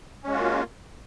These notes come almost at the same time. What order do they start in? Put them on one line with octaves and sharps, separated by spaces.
C#4 G#3 F#4 F4 A#3